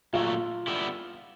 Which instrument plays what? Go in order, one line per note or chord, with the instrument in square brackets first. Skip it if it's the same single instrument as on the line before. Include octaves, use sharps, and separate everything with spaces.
[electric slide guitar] A#2 F#3 A3 [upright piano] F4
[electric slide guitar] D3 G3 B3 E4